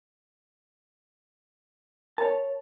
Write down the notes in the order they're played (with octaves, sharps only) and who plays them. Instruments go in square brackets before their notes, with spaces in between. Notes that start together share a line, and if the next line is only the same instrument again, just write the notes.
[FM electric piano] A#4 [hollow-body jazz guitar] C#5 A5